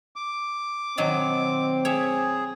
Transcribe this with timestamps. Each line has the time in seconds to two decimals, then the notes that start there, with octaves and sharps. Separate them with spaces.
0.16 D6
0.98 B2 D#3 F#3 C4
1.85 G#4 C#5 E5